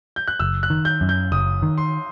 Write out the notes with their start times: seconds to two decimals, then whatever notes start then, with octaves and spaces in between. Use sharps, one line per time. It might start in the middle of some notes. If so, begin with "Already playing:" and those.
0.16 G6
0.28 F#6
0.40 F#1 E6
0.63 F#6
0.70 D#3
0.85 G6
1.01 F#2
1.09 G6
1.32 F#1 D#6
1.62 D#3
1.78 C6